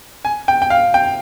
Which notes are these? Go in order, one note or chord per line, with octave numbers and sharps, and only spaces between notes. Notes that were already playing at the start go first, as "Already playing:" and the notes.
G#5
G5
G5
F5
G5